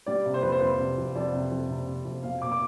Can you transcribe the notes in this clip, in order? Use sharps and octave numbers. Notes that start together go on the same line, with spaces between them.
G3 D5
C3
C5
F2 B4
C5
F2 B4
C3
F2
F2 D5
C3
F2
C3
C3
F2
B2 F5
B2 D6
D6